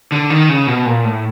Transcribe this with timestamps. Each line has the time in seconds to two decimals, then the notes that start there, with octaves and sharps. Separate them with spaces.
0.12 D3
0.30 D#3
0.49 C#3
0.67 B2
0.86 A#2
1.05 A2